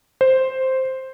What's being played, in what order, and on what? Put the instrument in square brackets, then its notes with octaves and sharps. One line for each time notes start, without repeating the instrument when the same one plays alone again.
[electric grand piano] C5